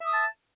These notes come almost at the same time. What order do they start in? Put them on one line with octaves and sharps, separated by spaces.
E5 D#6 A5